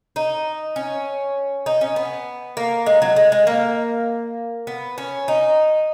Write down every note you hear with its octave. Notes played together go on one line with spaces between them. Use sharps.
D#4
C#4
D#4
C#4
B3
A#3
G#3
F#3
G#3
G#3
A#3
B3
C#4
D#4